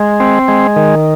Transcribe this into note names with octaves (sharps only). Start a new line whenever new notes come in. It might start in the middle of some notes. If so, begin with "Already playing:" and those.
Already playing: G#3
C4
G#3
D#3